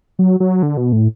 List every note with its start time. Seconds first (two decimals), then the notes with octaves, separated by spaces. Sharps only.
0.19 F#3
0.40 F#3
0.63 D3
0.77 B2
0.92 A2